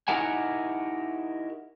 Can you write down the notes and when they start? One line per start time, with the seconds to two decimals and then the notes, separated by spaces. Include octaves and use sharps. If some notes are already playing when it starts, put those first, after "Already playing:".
0.08 D#4 E4 G4 A#4 F#5 G#5